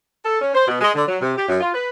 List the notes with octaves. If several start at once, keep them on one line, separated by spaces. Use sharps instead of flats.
A4
C#4
C5
B2
G#3
D3
F#3
C3
G4
F#2
F4
B4